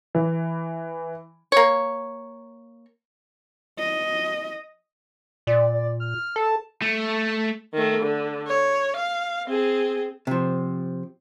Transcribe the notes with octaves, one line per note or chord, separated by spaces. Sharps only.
E3
A#3 C#5
D#5
A#2 D5
F6
A4 A5
A3
D#3 A3
D3
C#5
F5
C4 G#4
C3 F3